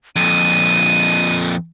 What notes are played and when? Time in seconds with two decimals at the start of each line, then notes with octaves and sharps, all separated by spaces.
0.16 F2 A#2 D#7